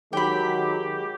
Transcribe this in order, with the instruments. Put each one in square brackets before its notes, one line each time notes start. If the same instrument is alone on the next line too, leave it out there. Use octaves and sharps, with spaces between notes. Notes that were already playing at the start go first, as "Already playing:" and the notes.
[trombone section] D#3 F#3 G#3 [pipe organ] G4 [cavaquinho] G5 B5